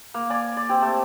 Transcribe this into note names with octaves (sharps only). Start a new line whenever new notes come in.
A#3
D5 G#5
D5
C4 G4
A3